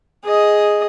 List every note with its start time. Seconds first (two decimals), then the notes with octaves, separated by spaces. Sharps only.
0.24 G#4 D#5